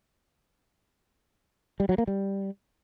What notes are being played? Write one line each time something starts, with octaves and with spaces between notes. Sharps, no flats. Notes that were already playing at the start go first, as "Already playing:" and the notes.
G3
F#3
A#3
G3